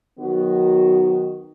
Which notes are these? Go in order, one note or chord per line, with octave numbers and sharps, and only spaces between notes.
D#3 F#3 B3 F#4